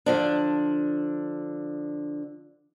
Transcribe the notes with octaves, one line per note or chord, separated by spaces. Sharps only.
D3 F3 D4